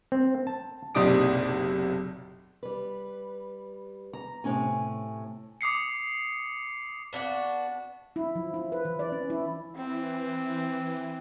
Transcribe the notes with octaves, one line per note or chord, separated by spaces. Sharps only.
C4
A5
F#1 B1 C3 D5 D#6 D7
G3 B4
A#5
A2 C3 C#4 G#5
D6 D#6 C7 C#7
B3 D4 F4 F#4
E4
F3
E4
B4
E3
D5
C#4
E4
E3 C4